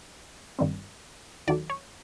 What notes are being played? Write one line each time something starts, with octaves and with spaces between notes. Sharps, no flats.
G#1 G2 D#3 G3 C4
D#2 D#3 F#3 A3 D5
C#5